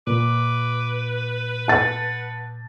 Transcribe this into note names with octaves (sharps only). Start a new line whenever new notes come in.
A#2 B4 D6
F#5 A5 A6